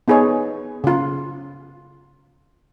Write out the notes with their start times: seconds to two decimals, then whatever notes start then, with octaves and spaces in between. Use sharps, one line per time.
0.08 B3 D#4 G#4 B4 C#5
0.84 C#3 F4